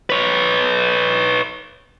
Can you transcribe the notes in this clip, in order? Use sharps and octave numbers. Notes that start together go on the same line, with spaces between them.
B4 C#5